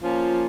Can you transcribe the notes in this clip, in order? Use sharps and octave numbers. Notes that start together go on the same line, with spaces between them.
F3 A#3 C#4 F4